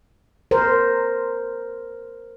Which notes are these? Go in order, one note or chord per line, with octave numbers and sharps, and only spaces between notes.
A#4 C5